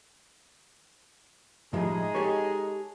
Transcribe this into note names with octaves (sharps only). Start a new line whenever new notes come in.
A2 F3 G3 G#3 D#4 G#4
G4 A4 C#5